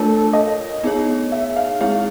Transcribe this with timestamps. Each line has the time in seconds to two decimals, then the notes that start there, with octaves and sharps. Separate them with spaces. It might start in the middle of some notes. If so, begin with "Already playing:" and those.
Already playing: A3 D4 F4 A4 A#4 C#5
0.33 D#5
0.83 B3 D#4 G#4 C#5
1.32 E5
1.56 F5
1.80 G#3 C4 E4 G#4 C#5 F5